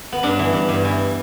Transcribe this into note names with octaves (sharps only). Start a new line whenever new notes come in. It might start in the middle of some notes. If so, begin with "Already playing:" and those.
B3
G2 D4
E3
G2
G2
E3